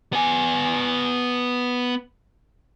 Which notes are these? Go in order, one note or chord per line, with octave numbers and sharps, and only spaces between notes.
B3 G#5